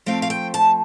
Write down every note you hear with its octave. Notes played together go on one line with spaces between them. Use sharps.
F3 A3 C4 F5
F5
G5
A5